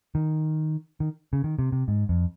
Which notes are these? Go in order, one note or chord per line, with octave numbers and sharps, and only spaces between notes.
D#3
D#3
C#3
D#3
C3
C3
G#2
F2